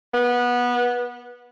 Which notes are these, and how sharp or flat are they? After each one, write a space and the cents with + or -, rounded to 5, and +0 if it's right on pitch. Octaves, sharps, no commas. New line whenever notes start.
B3 -20